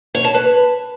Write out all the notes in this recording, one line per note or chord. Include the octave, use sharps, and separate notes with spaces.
C#5
A5
B4